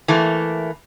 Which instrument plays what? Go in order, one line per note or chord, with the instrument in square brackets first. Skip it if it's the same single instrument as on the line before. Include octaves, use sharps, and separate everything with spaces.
[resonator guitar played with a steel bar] E3 A3 A#3